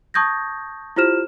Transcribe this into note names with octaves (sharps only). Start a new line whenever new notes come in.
A5 C#6 D#6 G6 G#6 A#6
E4 F4 G4 C5 F6 E7